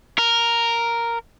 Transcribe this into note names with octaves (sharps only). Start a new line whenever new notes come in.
A#4